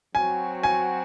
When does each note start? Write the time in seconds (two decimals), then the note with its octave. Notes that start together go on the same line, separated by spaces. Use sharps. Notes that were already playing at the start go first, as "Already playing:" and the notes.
0.15 F#3 C4 F#4 G#5
0.63 G#5